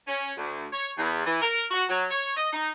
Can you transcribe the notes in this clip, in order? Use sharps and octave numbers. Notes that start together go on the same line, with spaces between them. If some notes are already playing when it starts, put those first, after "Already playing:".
C#4
D2
C#5
E2
E3
A#4
F#4
F#3
C#5
D#5
D#4